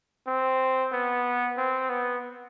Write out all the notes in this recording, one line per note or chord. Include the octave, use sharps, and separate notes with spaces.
C4
B3
C4
B3